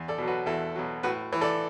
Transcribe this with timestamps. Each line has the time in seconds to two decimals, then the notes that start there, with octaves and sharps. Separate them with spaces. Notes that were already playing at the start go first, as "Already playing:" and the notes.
Already playing: E2
0.08 A4 D5
0.18 B2 F#3
0.27 F#4 B4
0.46 E2 E4 A4
0.75 B2 F#3
1.03 A2 F#4 B4
1.33 E3
1.41 A4 D5